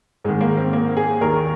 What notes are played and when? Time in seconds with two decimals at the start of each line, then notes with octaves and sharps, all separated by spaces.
0.25 G#2 D#3 G#3
0.41 A#3
0.57 C4
0.73 A#3
0.97 G#4
1.21 D#2 D#3 A#4